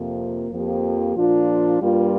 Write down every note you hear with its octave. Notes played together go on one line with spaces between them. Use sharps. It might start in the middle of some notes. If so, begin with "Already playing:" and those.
Already playing: F2 C3 A#3 F4
F2 F3 A#3 G4
A#2 F3 D4 F4
G2 G3 A#3 F4